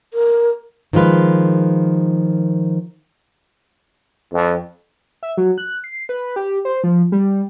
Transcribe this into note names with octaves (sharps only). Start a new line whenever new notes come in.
A#4
D#3 F3 G#3 F4 B4
F2
E5
F#3
F#6
C7
B4
G4
C5
F3
G3